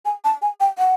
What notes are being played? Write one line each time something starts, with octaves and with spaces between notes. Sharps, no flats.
G#5
A5
G#5
G5
F#5